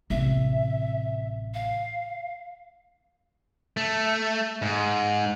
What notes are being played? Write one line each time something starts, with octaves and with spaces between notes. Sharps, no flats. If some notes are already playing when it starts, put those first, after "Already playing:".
A1 C3 E5
F5
A3
G#2